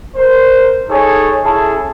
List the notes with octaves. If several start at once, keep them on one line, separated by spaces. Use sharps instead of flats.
A#4 C5
D#4 G#4 A4 C#5
C#4 E4 G#4 A4 A5